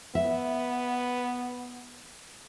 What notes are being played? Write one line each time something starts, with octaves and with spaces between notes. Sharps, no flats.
B3 E5